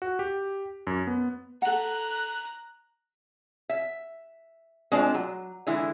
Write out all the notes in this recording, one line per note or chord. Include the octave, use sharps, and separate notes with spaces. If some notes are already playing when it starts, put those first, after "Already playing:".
F#4
G4
F#2
B3
A4 F#5 A#5 F#6
E5
G#3 C4 D4 F4 D5
F#3
D3 E3 G#3 E4